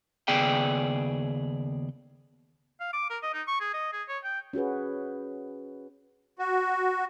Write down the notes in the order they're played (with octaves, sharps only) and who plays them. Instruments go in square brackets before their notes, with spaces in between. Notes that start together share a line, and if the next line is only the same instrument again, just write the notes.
[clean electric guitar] D#2 C#3 B3 G#4 D5 G5
[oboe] F5
D6
A#4
D#5
D#4
C#6
G#4
D#5
G#4
C#5
G5
[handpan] C#4 F#4 G#4 B4
[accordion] F#4